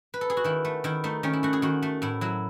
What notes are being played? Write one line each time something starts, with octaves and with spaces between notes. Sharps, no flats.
B4
A4
G#4
F#4
D#3 E4
A3
D#3 E4
A3 D#4
D#3 C#4
E4
A3 F#4
G#4
D#3 F#4
A3
A2 E4
F#3 E4